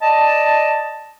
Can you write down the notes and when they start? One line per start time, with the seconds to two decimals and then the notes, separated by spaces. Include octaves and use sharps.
0.01 D5 D#5 A5